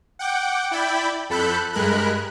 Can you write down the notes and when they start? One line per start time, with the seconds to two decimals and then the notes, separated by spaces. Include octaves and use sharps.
0.19 F#5 G5 D6
0.71 E4 D5 G5 B5
1.30 F2 A4 B5 F#6 G6
1.73 G2 G#3 A#4 B5 F#6